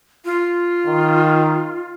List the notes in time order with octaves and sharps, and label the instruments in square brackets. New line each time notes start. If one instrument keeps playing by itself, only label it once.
[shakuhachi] F4
[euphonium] D#3